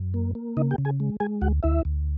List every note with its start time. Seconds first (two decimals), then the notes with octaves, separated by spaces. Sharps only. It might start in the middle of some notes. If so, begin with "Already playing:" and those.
Already playing: F#2
0.14 A#3
0.35 A#3
0.57 C#3 D#4 D#5
0.71 G4 G5
0.78 C#3
0.85 G#4 G#5
1.00 G#3
1.20 G#3 G#4 G#5
1.41 D2 F#4 F#5
1.63 D2 E4 E5
1.85 D2